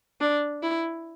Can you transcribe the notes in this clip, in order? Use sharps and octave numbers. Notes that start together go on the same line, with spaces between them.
D4
E4